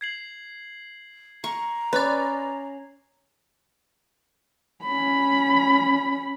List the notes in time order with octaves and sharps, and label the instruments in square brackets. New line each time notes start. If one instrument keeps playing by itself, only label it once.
[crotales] G#6 C7 F#7
[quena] A#5 [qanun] C#6
[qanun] C#4 [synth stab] B4 D5
[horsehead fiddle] C#4 B5